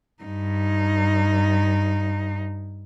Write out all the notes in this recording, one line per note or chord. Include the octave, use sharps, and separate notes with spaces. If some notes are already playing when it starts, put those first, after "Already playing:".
G2 D#4